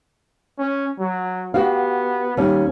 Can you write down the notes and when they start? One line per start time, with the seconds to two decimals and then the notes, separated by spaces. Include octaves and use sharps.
0.59 C#4
0.99 F#3
1.54 B3 F#4 G4 F5
2.37 D#2 G3 C#4